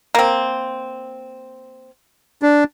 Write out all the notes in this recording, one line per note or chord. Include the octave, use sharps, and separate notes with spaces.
A#3 C4
D4